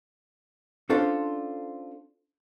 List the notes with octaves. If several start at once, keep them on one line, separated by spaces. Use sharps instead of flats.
C#4 D4 F4 A4 C5